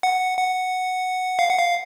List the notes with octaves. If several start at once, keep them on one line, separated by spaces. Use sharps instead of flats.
F#5
F#5
F5
F#5
F5